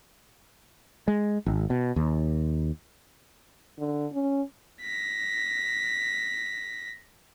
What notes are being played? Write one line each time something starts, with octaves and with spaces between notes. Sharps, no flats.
G#3
G#1
B2
D#2
D3
C#4
A#6 B6